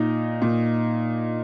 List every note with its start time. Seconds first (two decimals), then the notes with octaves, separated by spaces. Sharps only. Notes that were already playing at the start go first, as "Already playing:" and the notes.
Already playing: A#2 D#4
0.42 A#2